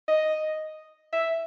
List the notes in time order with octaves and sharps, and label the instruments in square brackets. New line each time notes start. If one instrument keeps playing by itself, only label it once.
[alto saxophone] D#5
E5